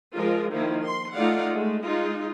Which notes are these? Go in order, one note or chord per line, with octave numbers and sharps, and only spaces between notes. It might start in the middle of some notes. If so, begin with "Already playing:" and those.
F3 G#3 F4 A#4
D#3 F3 A#3 E4
C6
A3 D#4 F4 D5 F5 F#5
G#3 A3
G#3 D#4 F4